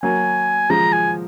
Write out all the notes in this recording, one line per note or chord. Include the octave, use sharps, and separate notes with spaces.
F#3 A#3 G#5
F3 G#3 A#5
G#5